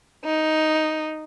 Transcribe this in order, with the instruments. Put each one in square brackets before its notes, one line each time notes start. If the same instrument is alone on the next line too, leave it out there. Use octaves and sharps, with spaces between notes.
[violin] D#4